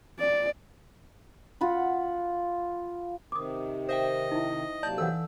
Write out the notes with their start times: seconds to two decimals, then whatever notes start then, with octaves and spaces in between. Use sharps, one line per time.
0.19 D5
1.61 F4 F#5 B5
3.32 C3 D#3 D6 D#6
3.89 C5 D#5 E5 G5
4.31 D#4 E4
4.83 C3 F#3 A#3 D5 A5 G6
4.98 E3 A4 F5 F#5 E6